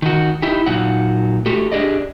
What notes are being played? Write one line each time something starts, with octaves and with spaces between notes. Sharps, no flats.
D#3 D#4 F#4
D#4 E4 G4
A#2 F#3 D#4 F#5
A3 F#4 G4 A4
D4 G4 G#4 D5 D#5